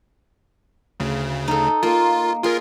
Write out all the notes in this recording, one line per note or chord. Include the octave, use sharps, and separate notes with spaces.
D2 C#3
D#4 A4
A#3 F4
F4 G#4 A#4